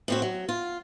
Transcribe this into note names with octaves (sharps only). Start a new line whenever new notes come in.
A2 C4 F#4
F#3
F4